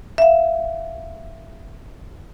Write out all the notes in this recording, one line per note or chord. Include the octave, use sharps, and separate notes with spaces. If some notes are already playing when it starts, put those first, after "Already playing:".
E5 F5